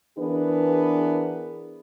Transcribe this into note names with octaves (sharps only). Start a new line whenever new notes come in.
E3 B3 D4 G#4 A#4 B4